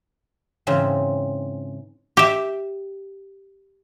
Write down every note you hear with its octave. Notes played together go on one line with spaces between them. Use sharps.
G#2 C#3 E3 C4
G4 E5